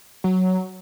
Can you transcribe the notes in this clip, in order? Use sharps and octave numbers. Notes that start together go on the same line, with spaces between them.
F#3